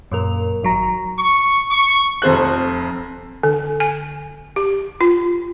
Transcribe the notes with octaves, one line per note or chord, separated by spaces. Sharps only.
F#2 A#2 A#4
G#1 F#3 A#5
C#6
C#6
F1 F2 C5 F#6
D3
G#5
G4
F4